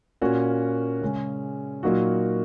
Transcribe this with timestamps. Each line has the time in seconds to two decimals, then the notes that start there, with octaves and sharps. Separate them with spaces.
0.21 A#2 A#3 C#4 F#4
1.02 C#3 G#3 C#4
1.83 A#2 F#3 A#3 D#4 F#4